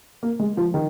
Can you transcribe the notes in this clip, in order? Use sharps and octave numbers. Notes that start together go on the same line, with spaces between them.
A#3
G#3
F3
D#3